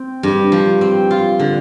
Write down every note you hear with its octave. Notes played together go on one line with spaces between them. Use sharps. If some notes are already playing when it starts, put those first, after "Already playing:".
Already playing: C4
G2
F3
C4
F4
D3